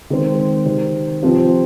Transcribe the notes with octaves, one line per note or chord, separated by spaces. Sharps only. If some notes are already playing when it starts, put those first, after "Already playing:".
D#3 G#3 C4
C3 D#3 C4
C3 F3 C4